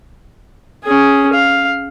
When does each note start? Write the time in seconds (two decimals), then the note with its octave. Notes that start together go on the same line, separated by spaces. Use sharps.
0.85 C#4 G#4
1.33 F5